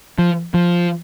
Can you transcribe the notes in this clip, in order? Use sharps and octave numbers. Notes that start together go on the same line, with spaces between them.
F3
F3